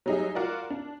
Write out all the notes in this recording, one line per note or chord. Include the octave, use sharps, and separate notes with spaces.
F#3 G3 D#4 G#4 D#5 E5
F4 F#4 A#4 D5
D4